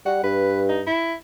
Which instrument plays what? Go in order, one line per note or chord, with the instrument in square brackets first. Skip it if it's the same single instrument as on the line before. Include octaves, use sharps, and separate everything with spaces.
[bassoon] G3 [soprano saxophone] F#5
[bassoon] G2 [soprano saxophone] B4
[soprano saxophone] D#4
E4